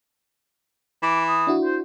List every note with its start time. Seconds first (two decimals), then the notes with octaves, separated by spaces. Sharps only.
1.03 E3 D6
1.28 D#6
1.47 D4 E4 F#4
1.64 C5